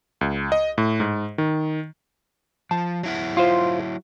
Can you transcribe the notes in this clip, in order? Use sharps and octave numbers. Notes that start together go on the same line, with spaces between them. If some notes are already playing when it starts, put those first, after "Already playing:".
C#2
D#5
A2
G#2
D#3
F3 A5
F#3 E4 F#4
F4 C5